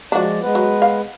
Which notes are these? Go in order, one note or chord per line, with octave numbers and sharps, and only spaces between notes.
F3 G#3 D4 F#4 D5
G#3 B3 B4
F#3
F5